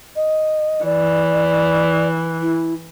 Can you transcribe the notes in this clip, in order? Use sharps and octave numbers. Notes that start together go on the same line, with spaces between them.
D#5
E3 D5
E4